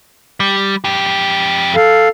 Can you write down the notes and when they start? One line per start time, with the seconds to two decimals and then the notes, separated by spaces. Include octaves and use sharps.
0.40 G3
0.84 F2 G4
1.75 A4 F5